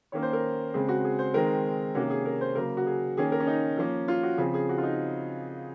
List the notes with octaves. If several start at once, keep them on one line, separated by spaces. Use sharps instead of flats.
D#3 A#3 C#4 C#5
C5
A#4
C#3 G#3 C4 G#4
F#4
G#4
C5
D#3 G#3 C4 A#4
C3 D#3 A#3 C#4 F#4
G#4
A#4
C5
C#3 F#3 A#3 A#4
F#4
G#4
D#3 A#3 C#4 G#4
A#4
C#4
D#4
F3 A#3 C#4
F4
F#4
C#3 F3 C4 G#4
G#4
F#4
F4
D#4